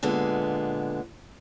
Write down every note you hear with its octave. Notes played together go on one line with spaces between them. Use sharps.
A#2 D3 G#3 B3